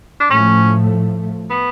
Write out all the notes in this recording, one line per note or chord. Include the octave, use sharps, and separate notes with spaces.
D4
A2 F3 A3 C#4
B3